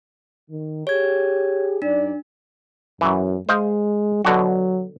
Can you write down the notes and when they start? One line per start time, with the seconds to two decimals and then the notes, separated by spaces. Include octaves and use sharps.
0.50 D#3
0.87 G4 G#4 C#5 G#6
1.82 F#2 D4 D#4 D5
3.01 F#2 E3 F#3
3.49 G#3 C5 D#5 F5
4.25 B2 D3 F#3 F#4